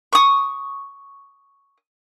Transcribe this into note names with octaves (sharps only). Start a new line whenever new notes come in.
C#6 D#6